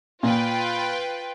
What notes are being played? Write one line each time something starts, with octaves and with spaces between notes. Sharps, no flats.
A#2 F4 B4 G5